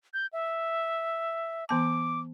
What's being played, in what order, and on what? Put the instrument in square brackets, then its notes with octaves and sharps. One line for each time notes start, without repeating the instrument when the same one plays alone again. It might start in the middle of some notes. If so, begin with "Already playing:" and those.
[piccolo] G6
E5
[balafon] E3 B3 A5 [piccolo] D6